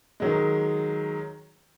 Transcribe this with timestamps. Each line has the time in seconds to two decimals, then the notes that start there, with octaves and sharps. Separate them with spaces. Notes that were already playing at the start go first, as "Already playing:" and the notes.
0.20 D#3 F#3 G#3